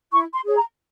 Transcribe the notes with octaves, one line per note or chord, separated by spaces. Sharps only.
E4 C#6
C6
G#4 C#5
A#5